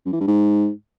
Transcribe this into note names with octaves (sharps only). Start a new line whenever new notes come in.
F#2
E3
G2
G#2